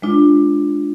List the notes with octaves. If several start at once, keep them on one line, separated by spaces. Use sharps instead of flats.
G#3 D4 F4